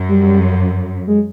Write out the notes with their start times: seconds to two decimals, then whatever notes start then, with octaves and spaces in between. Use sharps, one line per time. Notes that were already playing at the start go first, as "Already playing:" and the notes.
Already playing: F#2
0.09 G3
1.07 G#3